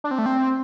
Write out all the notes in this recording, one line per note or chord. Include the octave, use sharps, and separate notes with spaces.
D4
C4
A3
C4